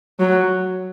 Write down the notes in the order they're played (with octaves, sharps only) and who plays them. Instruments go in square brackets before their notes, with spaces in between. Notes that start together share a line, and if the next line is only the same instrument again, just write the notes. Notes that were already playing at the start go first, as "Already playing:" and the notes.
[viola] F#3